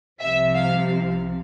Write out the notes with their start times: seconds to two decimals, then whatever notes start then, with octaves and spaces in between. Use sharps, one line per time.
0.20 C2 C3 F3 E5
0.55 F5